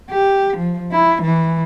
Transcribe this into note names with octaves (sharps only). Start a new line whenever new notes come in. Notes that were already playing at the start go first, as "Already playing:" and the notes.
G4
F3
E4
E3